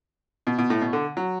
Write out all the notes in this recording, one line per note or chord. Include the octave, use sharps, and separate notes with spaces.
B2
B2
A2
B2
D3
F#3